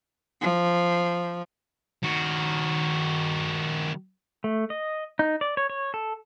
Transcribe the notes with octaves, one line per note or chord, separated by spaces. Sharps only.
F3
D#3 F#4
A3
D#5
D#4
D5
C#5
C#5
A4